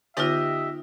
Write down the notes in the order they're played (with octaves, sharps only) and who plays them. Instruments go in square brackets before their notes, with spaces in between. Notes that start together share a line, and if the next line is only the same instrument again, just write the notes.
[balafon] D3 B3 C#5 [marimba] D#4 F4 [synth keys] G4 D#5 [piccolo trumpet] E5